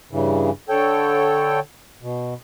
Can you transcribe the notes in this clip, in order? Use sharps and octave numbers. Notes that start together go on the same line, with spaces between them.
G2 C#3 E3
D3 A4 C#5 G5
B2